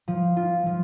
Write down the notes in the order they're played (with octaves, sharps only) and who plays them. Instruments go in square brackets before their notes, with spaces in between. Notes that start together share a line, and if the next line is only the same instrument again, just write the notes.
[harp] F3
F4
F3